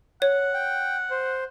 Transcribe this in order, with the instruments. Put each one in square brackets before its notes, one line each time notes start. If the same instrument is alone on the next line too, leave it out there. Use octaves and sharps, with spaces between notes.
[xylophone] C#5 [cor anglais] F#5
[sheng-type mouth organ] G5
C5